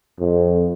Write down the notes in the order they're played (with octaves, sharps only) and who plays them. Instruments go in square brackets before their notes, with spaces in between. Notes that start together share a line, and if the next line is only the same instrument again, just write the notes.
[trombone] F2